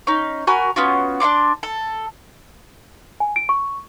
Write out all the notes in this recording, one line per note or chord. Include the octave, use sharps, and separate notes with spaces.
C#4 D#4
F#4 A#4 G#5 B5
B3 C#4 F4 F#4
D4 F#5 C6 D6
A4
G#5
D7
C#6